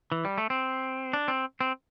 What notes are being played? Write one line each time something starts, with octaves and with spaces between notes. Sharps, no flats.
E3
G3
A3
C4
D4
C4
C4